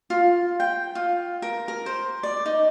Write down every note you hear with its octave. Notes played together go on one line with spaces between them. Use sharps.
F4
G5
F4
A#4
A#4
C5
D5
D#4